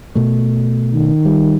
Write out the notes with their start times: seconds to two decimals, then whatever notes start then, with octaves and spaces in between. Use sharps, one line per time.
0.15 B2 A3
0.94 D#3
1.25 G3